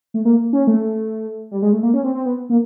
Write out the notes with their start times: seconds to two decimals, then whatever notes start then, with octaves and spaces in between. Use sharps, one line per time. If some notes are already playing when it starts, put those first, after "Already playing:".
0.14 A3
0.25 A#3
0.53 C#4
0.67 A3
1.51 G3
1.62 G#3
1.73 A3
1.83 A#3
1.94 C#4
2.04 C4
2.15 C4
2.26 B3
2.50 A#3